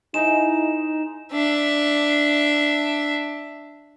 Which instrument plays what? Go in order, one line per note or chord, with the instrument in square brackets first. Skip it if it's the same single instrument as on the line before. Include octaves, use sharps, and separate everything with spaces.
[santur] G#3 C5 A#5 [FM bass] D#4 [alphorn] E4 [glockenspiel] E7
[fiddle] D4 E5